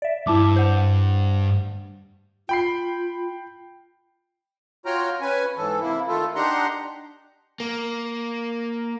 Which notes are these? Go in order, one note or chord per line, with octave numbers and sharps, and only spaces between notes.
D5 E5
G2 E4 A5 D6
C5 F#5
F4 G5 B5 C7
F4 F#4 C#5 G5 A#5 F6
C#4 B4 G#5
G#2 E3 A4
C3 A#3 E4
D#3 A3 F4 A4
D4 D#4 G4 F#5 A#5 C6
A#3